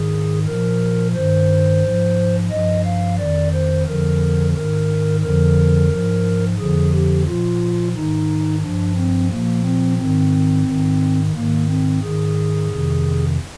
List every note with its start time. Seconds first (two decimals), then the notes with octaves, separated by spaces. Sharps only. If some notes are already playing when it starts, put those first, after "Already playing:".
Already playing: G#2 D#3 G#4
0.46 A#2 F3 A#4
1.14 G2 D#3 C5
1.82 G#2 F3
2.51 G2 F3 D#5
2.84 F5
3.18 F2 D#3 D5
3.53 C5
3.86 F2 D3 F3 A#4
4.55 G#2 D#3 A#4
5.22 F2 D3 F3 A#4
5.91 G#2 F3
6.58 F2 D3 F3 G#4
6.92 G4
7.27 A#2 F3 F4
7.95 G#2 D#3 D#4
8.62 G2 F3 D4
8.96 C4
9.30 A#2 F3 A#3
9.64 C4
9.98 G#2 D#3 C4
10.67 G#2 D#3
11.34 G#2 D#3 A#3
11.69 C4
12.02 G#2 D#3 G#4
12.70 F2 C3 D#3